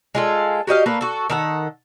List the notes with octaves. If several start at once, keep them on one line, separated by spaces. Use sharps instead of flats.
G#3 F4 A4
F#4 G4 D#5 F5
A3 A#3 B4
F#4 A4
D#3 A4 F#5